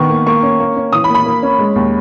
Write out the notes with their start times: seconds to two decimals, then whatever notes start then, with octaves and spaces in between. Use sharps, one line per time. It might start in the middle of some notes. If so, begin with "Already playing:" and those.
Already playing: D#3 B3 C#6
0.10 A#3
0.27 A#3 C#6
0.43 C#4
0.59 A#3
0.76 C#4
0.93 E3 D#6
1.04 B5
1.09 A#3
1.15 B5
1.26 A#3
1.43 C#4
1.59 G#3
1.76 D#2